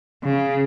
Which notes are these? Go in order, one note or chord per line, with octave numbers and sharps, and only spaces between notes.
C#3